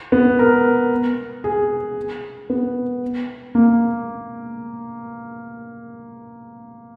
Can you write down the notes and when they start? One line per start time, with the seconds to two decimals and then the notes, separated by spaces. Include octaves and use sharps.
0.12 B3
0.39 A#4
1.44 G#4
2.50 B3
3.55 A#3